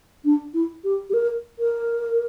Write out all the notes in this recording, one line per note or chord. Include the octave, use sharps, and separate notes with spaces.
D4
E4
G4
G4
A#4
A#4